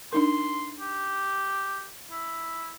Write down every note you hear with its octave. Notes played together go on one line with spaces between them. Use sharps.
D4 D#4 A#4 C6
G4
E4